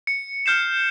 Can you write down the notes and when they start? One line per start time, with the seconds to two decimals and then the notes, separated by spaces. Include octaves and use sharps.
0.07 C#7
0.46 F6 G6 C7 E7